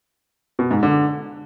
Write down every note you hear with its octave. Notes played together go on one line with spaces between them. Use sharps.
B2
G#2
D3